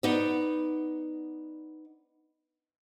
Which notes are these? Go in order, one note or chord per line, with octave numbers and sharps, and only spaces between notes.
B3 D#4 D5